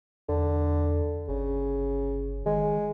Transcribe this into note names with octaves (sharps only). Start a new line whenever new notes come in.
E2 D3
G1 C#3
D#3 G#3